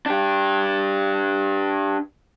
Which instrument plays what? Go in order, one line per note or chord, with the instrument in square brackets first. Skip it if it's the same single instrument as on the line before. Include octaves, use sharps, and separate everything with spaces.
[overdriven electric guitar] D4 G4